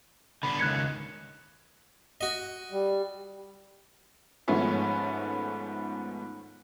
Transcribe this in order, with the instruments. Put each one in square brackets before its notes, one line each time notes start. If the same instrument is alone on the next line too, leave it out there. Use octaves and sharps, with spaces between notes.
[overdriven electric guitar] D3 B3 [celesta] B5
[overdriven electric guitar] C#2 D#3 [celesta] F#6 G#6 C#7
[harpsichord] F#4 D#5
[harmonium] G3
[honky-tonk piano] G#2 D#3 F3 A3 B3 C#4